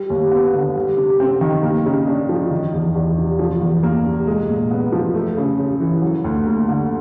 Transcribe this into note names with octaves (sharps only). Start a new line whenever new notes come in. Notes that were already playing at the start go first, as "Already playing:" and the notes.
Already playing: G3
D#2
B3
D3
G3
C3
C4
D#3
A#3
C#3
D4
F3
D#3
E2
E2
C3
F3
E2
A#3
C3
G#3
A#2
B3
F3
A3
C#3
C#3
E3
F#3
D2
A#3
D3